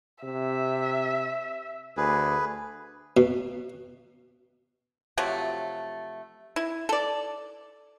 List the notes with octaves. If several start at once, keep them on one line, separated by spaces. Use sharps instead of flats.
C3 E5
D2 G#4 B4
B2
C3 F3 F#3 A3
E4
A4 D5